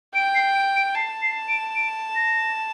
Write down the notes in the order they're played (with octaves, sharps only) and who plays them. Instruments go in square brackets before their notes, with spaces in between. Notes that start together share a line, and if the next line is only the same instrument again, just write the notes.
[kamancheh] G5 [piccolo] D7
[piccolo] C7
D7
D7
[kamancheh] A5 [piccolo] C7
[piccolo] C7
D7
D7
A#6